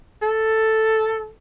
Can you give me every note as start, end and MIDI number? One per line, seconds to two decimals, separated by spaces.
0.22 1.29 69